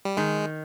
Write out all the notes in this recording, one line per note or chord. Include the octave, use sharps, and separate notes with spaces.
G3
D#3 G#3